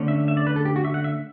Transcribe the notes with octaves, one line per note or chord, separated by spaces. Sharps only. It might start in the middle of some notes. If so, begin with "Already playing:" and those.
Already playing: D3 A3 C#4
E5
E5
D5
B4
A4
G4
F#4
E5
F#5
E5